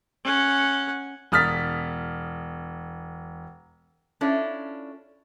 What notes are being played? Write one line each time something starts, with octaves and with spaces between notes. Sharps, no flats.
C#4 F#5
E1 D#6 F6 A6 B6
C#4 D4 E4 F4 A4